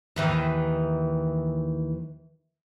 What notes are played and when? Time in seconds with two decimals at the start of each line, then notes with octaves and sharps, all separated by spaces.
0.16 D#2 D#3 E3